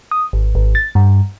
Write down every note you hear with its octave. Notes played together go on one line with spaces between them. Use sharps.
D#6
G#1
G#1
A6
G2